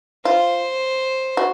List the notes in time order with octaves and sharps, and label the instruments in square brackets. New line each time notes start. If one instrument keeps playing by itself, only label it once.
[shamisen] F4 [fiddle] C5
[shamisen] F#4